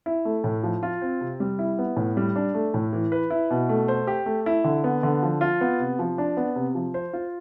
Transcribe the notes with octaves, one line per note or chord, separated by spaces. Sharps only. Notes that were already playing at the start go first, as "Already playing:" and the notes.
E4
A3
A2
F3
F4
C4
C3
G3
E4
B3
A2
G3
D4
A3
A2
E3
B4
E4
B2
A3
C5
G4
A3
E4
D3
B3
D3
F3
F4
B3
C3
F3
D4
B3
C3
F3
C5
F4